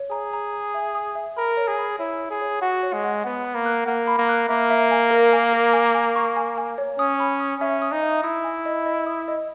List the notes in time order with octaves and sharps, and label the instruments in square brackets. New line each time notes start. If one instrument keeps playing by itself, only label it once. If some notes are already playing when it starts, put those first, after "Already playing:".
Already playing: [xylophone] C#5
[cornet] G#4 [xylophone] A#5
[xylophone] A#5
A#5
E5
D#6
E5
[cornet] A#4 [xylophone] B5
[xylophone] C#5
[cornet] G#4
[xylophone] B5
[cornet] E4 [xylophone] C#5
[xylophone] C#5
[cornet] G#4
[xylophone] C#5
[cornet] F#4 [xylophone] F#5
[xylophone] C#5
[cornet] G#3
[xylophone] F#5
[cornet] B3 [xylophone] F#5
[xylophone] B5
[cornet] A#3
[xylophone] F#6
[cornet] A#3 [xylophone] F#5
[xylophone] B5
[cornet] A#3
[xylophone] F#6
[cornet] A#3 [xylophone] E5
[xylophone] E5
G#5
A#4
G#5
A#4
G#5
G#5
C#6
G#5
G#5
C#5
[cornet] C#4 [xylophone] D#6
[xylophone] B5
D#6
[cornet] C#4 [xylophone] E5
[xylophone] D#6
[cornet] D#4
[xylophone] E5
[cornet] E4 [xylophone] D#6
[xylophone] G#5
D#5
D#5
D#6
D#5